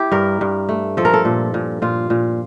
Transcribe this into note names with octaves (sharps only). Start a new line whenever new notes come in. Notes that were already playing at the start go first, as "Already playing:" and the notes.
Already playing: E4 G4
G2 A#4
G2
A3
F3 A4
A#4
A4
A#2
A#2
A#2 F4
A#2